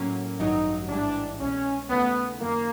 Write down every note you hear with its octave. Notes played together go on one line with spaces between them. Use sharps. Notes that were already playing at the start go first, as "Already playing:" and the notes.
Already playing: A2 F#3 A#3 C#4
A1 G2 D#3 F#3 D#4
A1 G#2 E3 G3 D4
C2 B2 G#3 C#4
D#2 C#3 E3 A3 B3
F#2 D#3 G3 A#3